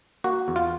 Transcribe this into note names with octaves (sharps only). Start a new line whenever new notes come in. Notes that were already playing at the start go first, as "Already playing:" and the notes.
A#3 F#4
E2
F4